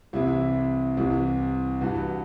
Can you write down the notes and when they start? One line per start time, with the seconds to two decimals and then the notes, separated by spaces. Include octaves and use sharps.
0.13 C2 C3 E3 E4
0.97 C2 C3 E3
1.81 G2 E3 F#4